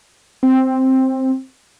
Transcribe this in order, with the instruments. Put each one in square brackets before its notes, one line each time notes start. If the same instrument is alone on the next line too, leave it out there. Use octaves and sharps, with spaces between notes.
[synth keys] C4